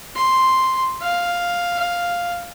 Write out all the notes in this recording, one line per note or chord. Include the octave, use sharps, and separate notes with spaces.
C6
F5